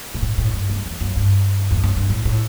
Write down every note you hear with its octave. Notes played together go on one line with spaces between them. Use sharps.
B2
A2
A2
G2
F#2
E2
F#2
G2
E2
F#2
G2
A2
A2